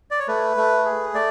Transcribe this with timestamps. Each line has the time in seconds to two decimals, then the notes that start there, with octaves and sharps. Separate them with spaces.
0.11 D5
0.19 C#5
0.28 A3 B4
0.57 A3
0.85 G#4
1.14 A3 D5